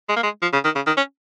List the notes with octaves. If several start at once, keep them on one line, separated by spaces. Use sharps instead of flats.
G#3
A#3
G#3
F3
C#3
D#3
C#3
D#3
C#4